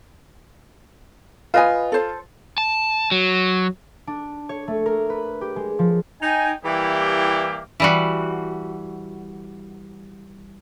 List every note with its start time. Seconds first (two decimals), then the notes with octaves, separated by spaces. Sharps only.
1.54 F4 B4 D#5 G#5
1.92 A4 C5
2.58 A5
3.11 F#3
4.07 D4
4.49 C#5
4.68 A3
4.86 A#4
5.10 B4
5.41 G4
5.56 G#3
5.79 F3
6.21 D#4 G5 G#5
6.65 E3 G3 A#3 E4 G4
7.80 E3 G3 F#4